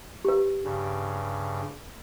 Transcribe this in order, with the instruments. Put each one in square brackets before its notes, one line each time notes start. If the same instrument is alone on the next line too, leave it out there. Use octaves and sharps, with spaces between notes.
[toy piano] G4 B4
[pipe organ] G2 C#3